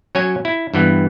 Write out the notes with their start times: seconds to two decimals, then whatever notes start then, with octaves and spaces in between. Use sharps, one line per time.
0.15 F#3 C#4 C#5 G#5
0.45 E4
0.74 G2 E3 B3